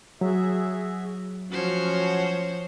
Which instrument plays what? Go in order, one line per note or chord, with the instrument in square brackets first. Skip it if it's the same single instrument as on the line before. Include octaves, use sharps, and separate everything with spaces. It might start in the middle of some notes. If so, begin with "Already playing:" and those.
[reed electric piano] F#3 [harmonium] F#4 G#4 E5
[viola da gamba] F3 C5 C#5 [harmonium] C#4 F#4